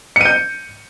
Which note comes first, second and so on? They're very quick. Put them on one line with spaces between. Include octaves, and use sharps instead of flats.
C#7 D#7 G6